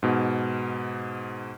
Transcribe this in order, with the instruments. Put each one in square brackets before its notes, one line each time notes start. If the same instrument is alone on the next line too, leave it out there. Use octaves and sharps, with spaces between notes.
[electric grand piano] G#2 B2